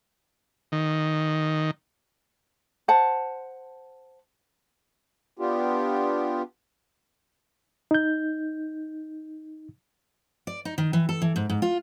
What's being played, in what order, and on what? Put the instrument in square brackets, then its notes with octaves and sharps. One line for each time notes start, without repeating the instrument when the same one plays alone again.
[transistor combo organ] D#3
[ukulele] C5 F#5 A5
[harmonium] B3 D4 F4 G4
[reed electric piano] D#4 G6
[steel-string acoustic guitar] D5
D#4
D#3
E3
A4
E3
G#2
G#2
F4